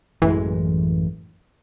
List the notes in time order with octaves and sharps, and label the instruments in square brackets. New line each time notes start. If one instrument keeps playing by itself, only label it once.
[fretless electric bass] A1 F#2 G#3 [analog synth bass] E3